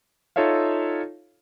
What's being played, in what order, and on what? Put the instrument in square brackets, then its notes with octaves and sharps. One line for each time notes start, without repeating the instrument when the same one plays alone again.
[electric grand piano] D#4 F4 A4 C#5 E5 F5